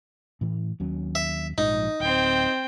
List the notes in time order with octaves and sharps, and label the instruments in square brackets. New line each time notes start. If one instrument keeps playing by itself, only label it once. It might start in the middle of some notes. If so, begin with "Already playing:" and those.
[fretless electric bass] A2 E3
D#2 F#3 C#4
[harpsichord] E5
[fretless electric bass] A#1 G#2 F3 [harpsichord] D#4
[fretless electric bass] D1 [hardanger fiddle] C4 G5